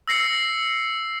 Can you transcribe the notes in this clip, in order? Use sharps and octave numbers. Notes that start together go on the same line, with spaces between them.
E6 A#6 C7 C#7